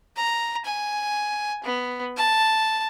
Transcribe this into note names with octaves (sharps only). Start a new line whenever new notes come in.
A#5
G#5
B3
A5